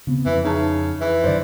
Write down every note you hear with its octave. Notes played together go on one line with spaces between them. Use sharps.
C#3 B3 C4
F2 E3
C#3 D#4 A5
E3
F#2 D3 C5 D5